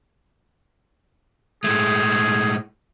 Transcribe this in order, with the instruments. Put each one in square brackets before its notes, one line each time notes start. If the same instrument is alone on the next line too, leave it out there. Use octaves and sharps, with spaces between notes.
[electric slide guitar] A2 G#3 A3 [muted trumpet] G#4